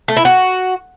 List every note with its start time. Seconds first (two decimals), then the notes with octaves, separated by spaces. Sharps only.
0.08 A3
0.17 E4
0.25 F#4